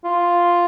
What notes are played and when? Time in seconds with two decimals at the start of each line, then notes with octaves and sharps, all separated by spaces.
0.05 F4